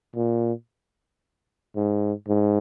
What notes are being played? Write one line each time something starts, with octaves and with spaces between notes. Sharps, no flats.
A#2
G#2
G#2